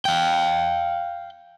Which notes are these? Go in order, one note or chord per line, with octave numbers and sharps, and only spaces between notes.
F5 G5